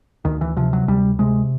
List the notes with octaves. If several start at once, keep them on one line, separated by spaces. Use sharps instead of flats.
D2 D#3
E3
C3 F3
F#3
D2 G3
C3 G#3